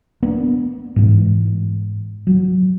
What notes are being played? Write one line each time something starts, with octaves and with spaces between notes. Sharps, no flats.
A#3 B3 D4
G#2 E3
F#3